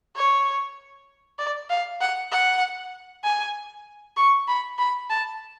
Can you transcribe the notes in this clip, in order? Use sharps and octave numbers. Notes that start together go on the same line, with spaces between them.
C#5
D5
F5
F#5
F#5
G#5
C#6
B5
B5
A5